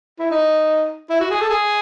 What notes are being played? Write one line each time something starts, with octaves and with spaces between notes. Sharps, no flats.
E4
D#4
E4
F#4
G#4
A4
G#4